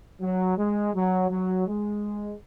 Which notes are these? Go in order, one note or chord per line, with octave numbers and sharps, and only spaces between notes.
F#3
G#3
F#3
F#3
G#3